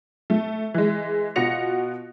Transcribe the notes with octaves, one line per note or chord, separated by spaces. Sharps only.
A3
E3 G#3
B2 F4 F#4 A#6 C#7 F7